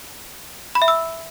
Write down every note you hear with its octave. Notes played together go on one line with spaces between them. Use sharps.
B5
E5
E6